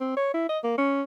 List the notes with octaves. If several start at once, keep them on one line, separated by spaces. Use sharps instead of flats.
C4
C#5
E4
D#5
A#3
C#4